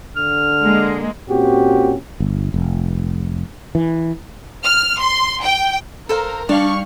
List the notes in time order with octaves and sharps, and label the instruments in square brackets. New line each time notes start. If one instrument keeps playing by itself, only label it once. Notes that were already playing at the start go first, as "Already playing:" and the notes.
[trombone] D3 [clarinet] F6
[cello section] G#3 A#3
[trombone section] A#2 C4 C#4 F#4 G4
[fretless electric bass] G1
F1
E3
[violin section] F6
C6
G5
[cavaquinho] A4 C5 F5 [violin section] A#4 A#5
[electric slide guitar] G3 F5 [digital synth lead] D4 [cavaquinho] D5 [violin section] C#6 F6